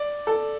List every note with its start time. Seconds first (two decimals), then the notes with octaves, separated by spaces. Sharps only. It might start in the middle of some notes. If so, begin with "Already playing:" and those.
Already playing: D5
0.27 A4